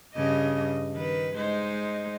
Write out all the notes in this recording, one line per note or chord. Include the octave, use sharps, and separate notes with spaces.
G2 C#3 D#5
D#3 B4
G#3 D#4 C5